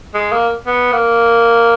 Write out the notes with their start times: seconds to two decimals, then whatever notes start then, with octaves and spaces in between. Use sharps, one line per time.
0.14 G#3
0.32 A#3
0.67 B3
0.92 A#3